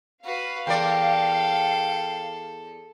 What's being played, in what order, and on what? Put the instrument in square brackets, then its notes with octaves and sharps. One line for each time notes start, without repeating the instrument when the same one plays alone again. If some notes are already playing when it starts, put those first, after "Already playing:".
[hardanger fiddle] F#4 B4 [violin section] F5
[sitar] E2 A#4 D5 [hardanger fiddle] A4 [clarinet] G5